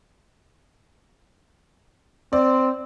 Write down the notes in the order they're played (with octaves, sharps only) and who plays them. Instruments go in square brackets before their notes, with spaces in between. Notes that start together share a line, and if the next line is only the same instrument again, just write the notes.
[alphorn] C4 [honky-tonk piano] D5